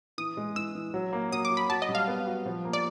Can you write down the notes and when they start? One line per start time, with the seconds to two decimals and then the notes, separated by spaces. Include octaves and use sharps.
0.18 E3 D#6
0.37 G#3
0.56 E3 E6
0.75 E3
0.94 F#3
1.13 A#3
1.32 F#3 D#6
1.45 D6
1.50 F#3
1.57 B5
1.70 F#4 A5
1.82 D#5
1.89 G3
1.95 F5
2.08 B3
2.27 F#4
2.46 F3
2.65 A#3
2.73 D5